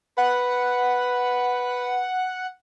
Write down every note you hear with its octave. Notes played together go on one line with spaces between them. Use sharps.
B4 F#5